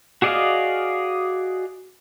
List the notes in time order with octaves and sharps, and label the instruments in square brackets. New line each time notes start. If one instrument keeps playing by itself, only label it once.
[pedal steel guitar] F#4 G#4 D5 D#5 F5